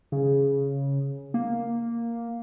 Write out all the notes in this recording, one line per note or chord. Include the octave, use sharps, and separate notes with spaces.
C#3
A#3